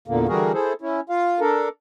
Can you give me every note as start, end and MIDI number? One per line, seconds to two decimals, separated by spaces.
0.08 0.27 40
0.08 0.27 46
0.08 0.27 50
0.08 0.27 58
0.28 0.52 50
0.28 0.52 52
0.28 0.52 55
0.28 0.52 66
0.28 0.52 68
0.28 0.52 70
0.54 0.73 64
0.54 0.73 68
0.54 0.73 69
0.54 0.73 72
0.81 1.00 61
0.81 1.00 64
1.09 1.40 65
1.09 1.40 77
1.40 1.69 62
1.40 1.69 69
1.40 1.69 70